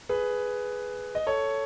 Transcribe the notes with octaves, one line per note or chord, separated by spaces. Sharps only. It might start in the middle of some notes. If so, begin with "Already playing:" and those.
G#4 B4
D#5
A4 C#5